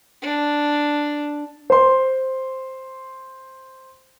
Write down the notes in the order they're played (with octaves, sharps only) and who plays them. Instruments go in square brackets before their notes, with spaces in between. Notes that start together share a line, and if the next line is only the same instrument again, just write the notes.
[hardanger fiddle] D4
[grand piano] C5 C6